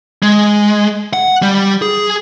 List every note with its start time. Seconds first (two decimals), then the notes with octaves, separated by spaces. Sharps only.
0.23 G#3
1.13 F#5
1.42 G3
1.82 G#4